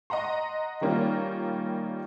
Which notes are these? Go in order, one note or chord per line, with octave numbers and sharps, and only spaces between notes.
D#5 F#5 A#5 C6
D#3 G3 A#3 C#4 D#4 F4